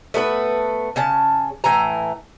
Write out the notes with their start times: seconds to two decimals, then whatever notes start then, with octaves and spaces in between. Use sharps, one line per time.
0.14 A3 B3 A#4 B4
0.96 C#3 C#4 A5
1.64 A2 E3 G#5 A#5